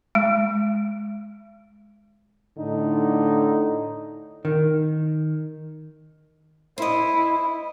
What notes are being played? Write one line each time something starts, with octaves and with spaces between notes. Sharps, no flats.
G#3
A2 D3 D#4
D#3
E4 C5 D#5